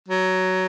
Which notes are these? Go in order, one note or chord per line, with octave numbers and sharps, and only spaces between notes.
F#3